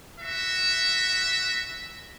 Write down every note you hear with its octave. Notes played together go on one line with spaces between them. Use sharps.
F#4 E5